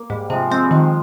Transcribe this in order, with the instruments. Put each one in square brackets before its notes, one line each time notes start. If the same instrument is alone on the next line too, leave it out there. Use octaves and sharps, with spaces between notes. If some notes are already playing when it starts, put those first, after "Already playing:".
Already playing: [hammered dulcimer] A#3
[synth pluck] G#2 [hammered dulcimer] G3
[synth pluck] C3 [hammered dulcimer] F3 G#3
[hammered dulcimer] F3 G#3 [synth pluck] C4
[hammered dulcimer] G3
[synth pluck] D#3 [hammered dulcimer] F3 G#3